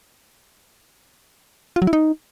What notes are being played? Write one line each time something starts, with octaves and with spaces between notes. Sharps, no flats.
F4
F#3
E4
D#4